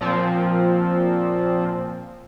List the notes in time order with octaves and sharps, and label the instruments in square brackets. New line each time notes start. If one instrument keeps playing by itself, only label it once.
[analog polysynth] A#2 F3 C4